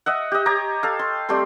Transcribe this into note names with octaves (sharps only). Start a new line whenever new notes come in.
D#5 E5 F#5
G4 D#5
G4 C#5 A#5
A4 F5
C6
G3 A3 C4 C6